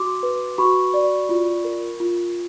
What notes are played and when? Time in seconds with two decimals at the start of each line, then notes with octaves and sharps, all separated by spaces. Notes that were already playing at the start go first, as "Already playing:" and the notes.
Already playing: F#4 C6 D6
0.23 B4
0.58 F#4 B5 C#6
0.94 D5
1.29 F4
1.64 A#4
2.00 F4